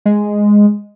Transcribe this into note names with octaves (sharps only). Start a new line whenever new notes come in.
G#3